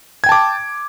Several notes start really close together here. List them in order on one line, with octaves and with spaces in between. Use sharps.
G#6 G5 A5 D6